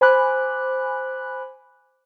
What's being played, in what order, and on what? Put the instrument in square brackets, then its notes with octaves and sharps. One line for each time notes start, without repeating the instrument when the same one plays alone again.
[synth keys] C5 G#5 B5 D6 F#6